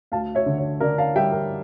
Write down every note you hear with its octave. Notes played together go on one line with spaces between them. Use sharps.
D2 F5 A5
C#5 E5
D3
C#5
D3 A#4 D5
F5 A5
G3 E5 G5
A#4